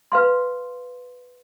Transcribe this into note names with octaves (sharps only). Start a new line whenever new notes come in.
B4 F5 C6